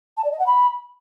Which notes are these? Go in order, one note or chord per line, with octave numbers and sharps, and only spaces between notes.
A5
D5
D#5
F#5
B5